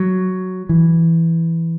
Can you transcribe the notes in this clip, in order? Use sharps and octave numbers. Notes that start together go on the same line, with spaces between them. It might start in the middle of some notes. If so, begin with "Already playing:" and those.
Already playing: F#3
E3